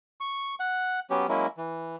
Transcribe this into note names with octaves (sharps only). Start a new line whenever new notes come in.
C#6
F#5
F#3 B3 C#4 G4
F#3 G#3 A#3 C#4 E4
E3